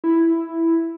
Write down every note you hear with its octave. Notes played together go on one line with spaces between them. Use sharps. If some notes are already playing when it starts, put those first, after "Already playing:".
E4